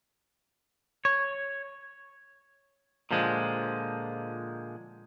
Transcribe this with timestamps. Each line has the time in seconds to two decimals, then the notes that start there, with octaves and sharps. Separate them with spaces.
1.05 C#5
3.11 A#2 D3 F3 G#3